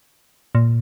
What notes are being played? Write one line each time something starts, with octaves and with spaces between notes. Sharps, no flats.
A#2